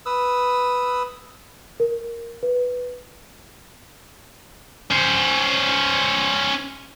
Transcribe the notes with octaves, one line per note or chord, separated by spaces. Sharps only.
B4 D#6 E6
A#4
B4
C#4 C5